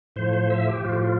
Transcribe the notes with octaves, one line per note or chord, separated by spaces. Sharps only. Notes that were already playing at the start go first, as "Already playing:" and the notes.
A2 F3 C5
C5
E5
G4
A2 F3 F4
G4
F4